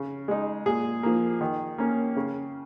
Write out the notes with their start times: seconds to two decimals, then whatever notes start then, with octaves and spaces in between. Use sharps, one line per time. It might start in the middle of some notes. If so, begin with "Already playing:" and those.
Already playing: C#3
0.28 G#3 D#4
0.66 A#2 G#4
1.03 F3 A#3
1.41 D#3
1.78 A#3 C#4
2.16 C#3